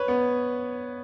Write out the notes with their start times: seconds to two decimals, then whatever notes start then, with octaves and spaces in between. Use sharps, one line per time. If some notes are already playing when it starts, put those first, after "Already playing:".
Already playing: B4 C#5
0.08 B3